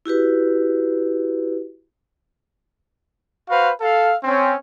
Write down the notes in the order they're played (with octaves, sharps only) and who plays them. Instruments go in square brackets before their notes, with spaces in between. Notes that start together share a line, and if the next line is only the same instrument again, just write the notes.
[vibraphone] E4 F#4 G4 B4
[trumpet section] F#4 B4 C5 F5
A4 F5
C4 C#4